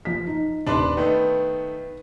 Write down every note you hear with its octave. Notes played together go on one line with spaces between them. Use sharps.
F3 B6
D#4
D#1 D4 B4 D5 C6
D#3 A3 B3 B4